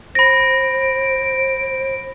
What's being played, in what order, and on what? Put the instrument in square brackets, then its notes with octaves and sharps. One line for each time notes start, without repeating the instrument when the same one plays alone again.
[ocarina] C5 [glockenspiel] B5 A#6 [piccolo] D7